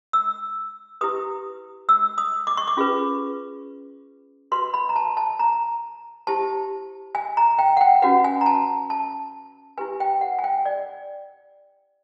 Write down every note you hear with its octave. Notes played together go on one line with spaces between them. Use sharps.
E6
E4 G4 B4 D#6
E6
D#6
D6
C#6
D6
C#4 F4 G#4 B4
F#4 B4 C6
B5
A#5
A5
A5
A#5
E4 G4 C5 A5
G#5
A#5
G5
F#5
G5
C#4 F#4 B4 F#5
G#5
A#5
A5
A5
E4 G4 B4 G#5
G5
F#5
G#5
G5
D5